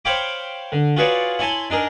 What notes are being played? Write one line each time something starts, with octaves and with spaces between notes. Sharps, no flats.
C5 C#5 F5 G5 B5 D6
D3
F4 F#4 G#4 B4 C#5 D5
E4 C#5 G#5 A5 B5 C6
D4 D#4 G#4 A#4